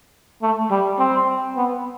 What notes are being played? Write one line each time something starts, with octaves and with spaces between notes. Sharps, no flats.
A3
G3
C4
B3